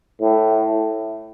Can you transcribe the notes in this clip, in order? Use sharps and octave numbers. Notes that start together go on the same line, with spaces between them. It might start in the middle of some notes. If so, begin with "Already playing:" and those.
A2